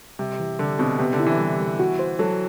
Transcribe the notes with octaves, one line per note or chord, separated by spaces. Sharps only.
C3 G3
E3
D3 G3
B2 C4
C3 B3
D3
E4
E3
G3
G3
F#4
C5
F#3 A4